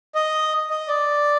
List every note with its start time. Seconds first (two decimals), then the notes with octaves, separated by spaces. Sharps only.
0.15 D#5
0.70 D#5
0.88 D5